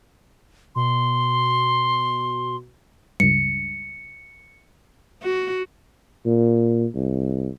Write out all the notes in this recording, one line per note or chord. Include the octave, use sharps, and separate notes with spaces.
B2 C6
C#2 G2 C#7
F#4
A#2
C2